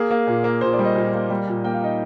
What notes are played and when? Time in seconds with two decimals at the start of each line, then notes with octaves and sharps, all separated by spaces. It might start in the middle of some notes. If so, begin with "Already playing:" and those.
Already playing: A#3 G#4
0.11 A#3
0.27 A#2
0.44 A#3
0.61 A#2 C5
0.73 D5
0.79 G3
0.85 D#5
0.96 A#2
1.14 A#3
1.30 G3
1.47 A#2
1.64 A#3 G5
1.74 F5
1.81 D#4 D#5